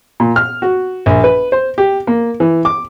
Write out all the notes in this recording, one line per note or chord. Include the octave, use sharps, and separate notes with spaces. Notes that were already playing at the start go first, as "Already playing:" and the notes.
A#2
F6
F#4
A#1
B4
C5
G4
A#3
E3
D6